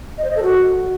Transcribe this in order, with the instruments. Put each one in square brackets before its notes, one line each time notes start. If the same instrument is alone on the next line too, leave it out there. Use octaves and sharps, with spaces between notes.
[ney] D#5
C5
D#5
A4
F#4